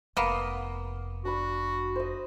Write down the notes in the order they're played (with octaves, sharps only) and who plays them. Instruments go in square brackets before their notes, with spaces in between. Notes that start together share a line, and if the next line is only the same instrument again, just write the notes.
[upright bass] F1 [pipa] A#3 B3
[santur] D4 B5 [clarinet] F#4
[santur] C5 D#5